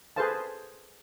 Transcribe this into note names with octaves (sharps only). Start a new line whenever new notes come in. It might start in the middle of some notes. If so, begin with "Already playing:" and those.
G#4 A4 B4 C5 F5 A5